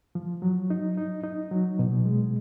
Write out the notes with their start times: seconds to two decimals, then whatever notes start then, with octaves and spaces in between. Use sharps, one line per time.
0.15 F3
0.42 F#3
0.70 D#4
0.97 D#4
1.24 D#4
1.51 F#3
1.79 B2
2.06 G#3